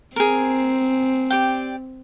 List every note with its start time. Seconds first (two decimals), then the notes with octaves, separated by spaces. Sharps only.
0.16 C4 G#4 A#4
1.30 G4 D5 G5